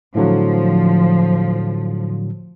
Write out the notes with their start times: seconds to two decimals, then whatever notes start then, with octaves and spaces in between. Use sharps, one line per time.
0.15 A2 D3 F3 F#3